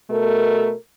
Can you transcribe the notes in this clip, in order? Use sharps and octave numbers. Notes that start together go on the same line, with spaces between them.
B2 A3 A4 A#4